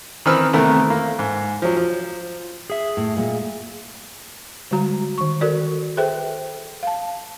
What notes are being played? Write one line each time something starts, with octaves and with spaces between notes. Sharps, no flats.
D#3 E3 C4 B4 E6 F6
C3 D#3 E3 A3 B3 A#4
A#3
G#2
F3 F#3
F3
G#4 E5
A2
A#2 G#3
D3 G3 G#3 F#4 A#5
D#3 C#6
F#4 A4 A#4 D5
G#4 A4 B4 C5 E5 G5
F5 A5